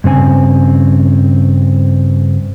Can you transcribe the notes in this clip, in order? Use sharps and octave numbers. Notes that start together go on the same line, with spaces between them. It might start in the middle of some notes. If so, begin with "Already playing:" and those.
G2 C#3 C4 G#5